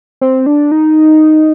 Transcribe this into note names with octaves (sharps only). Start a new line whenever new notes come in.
C4
D4
D#4